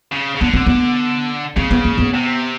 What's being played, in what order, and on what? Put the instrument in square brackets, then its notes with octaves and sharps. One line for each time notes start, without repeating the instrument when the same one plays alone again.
[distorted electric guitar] C#3
C#3
[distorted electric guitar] D3 [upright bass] B3
[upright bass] C4
B3
[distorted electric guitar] C#3 [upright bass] C4
[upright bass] B3
A#3
B3
[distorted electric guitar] C3